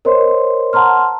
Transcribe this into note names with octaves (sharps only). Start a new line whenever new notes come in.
A#4 C5 C#5 D#5 C6
F#5 A5 A#5 C6 F6